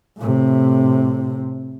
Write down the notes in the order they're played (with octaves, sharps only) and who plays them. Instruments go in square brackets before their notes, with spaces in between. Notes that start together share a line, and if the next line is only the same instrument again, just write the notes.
[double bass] A2 C3